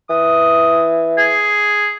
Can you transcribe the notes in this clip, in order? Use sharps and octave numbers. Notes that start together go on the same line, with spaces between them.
E3 D#6
G#4